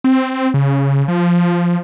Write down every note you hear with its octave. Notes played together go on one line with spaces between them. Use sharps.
C4
C#3
F3